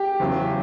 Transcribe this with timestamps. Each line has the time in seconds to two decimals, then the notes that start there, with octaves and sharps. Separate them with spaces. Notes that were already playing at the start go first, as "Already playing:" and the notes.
Already playing: G4
0.20 E2 C#3 F#3